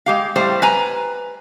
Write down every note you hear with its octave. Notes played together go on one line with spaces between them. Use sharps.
G#3 G4 F5
A2 G3 C5
B4 G#5 A#5